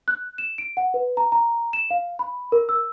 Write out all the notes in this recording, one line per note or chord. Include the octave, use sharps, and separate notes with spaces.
F#6
E7
D7
F#5
B4
A#5
A#5
E7
F5
B5
A#4
E6